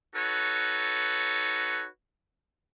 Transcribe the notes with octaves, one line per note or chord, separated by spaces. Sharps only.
D#4 F#4 A4 B4 C#5